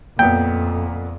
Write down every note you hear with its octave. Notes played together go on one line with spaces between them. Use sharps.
F2 A#2 B3 G5